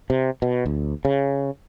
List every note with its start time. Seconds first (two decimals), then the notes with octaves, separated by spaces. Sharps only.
0.10 C3
0.42 B2
0.66 D2
1.05 C#3